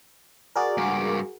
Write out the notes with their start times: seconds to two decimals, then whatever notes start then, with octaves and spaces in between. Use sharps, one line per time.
0.56 F#4 G#4 A#4 D5
0.78 C#2 G2 D6